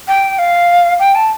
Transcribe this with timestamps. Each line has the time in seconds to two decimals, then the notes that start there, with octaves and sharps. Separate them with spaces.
0.08 G5
0.39 F5
1.00 G5
1.15 A5